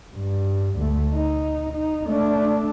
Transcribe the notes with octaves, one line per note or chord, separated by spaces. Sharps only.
G2
D2 A3
D#4
D#4
A3 D4